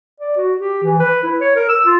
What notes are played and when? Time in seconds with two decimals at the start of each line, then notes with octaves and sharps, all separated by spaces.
0.20 D5
0.37 F#4
0.58 G4
0.83 E3
1.00 B4
1.23 E4
1.40 C#5
1.56 A#4
1.69 E6
1.86 F4